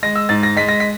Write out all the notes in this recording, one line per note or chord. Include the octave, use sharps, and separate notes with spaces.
G#3 A#6
E6
G#2 A6
A#6
G#3 B6
A#6
B6